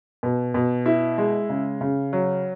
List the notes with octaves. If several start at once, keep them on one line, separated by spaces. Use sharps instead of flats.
B2
B2
E4
G#3
C#3
C#3
F#3